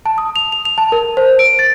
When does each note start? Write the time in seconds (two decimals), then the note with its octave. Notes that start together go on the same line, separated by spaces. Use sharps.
0.06 A5
0.18 D#6
0.36 F7
0.52 F7
0.65 F7
0.78 A5
0.92 A#4
1.17 C5
1.39 D7
1.59 A6